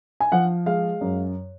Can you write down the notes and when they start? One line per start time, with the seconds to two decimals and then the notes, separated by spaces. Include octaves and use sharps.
0.20 G#5
0.32 F3 F#5
0.66 G#3 F5
1.01 F#2